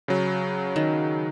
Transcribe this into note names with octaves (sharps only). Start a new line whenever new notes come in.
C#3 F#3
D#3